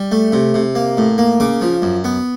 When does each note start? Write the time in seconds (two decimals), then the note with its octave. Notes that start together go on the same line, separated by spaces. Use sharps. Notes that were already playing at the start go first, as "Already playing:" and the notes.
Already playing: G3
0.11 A3
0.32 C3
0.54 C3
0.75 A#3
0.97 A2
1.18 A#3
1.40 C#3 D6
1.61 F3
1.82 F#2
2.04 B3